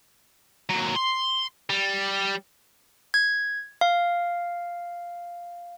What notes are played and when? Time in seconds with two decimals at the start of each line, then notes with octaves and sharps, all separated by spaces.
0.69 D#2 F#3
0.95 C6
1.70 G3
3.14 G#6
3.81 F5